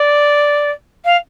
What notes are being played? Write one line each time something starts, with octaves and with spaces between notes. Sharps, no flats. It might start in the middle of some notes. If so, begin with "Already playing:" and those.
Already playing: D5
F5